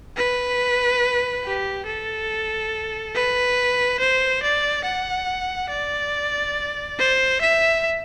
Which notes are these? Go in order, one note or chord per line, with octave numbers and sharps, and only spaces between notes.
B4
G4
A4
B4
C5
D5
F#5
D5
C5
E5